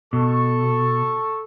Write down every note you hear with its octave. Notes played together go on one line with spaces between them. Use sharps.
B2 A4 C#6